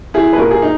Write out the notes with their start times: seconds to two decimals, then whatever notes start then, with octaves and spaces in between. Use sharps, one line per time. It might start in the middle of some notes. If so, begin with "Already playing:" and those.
0.14 E4 G#4
0.33 B4
0.38 A#2 F#4 A#4
0.51 G#4
0.62 D#4